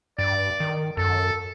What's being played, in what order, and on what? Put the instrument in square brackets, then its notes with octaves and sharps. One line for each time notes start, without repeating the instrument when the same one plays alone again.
[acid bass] G2 [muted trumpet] D5
[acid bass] D#3
[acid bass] F#2 [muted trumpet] A4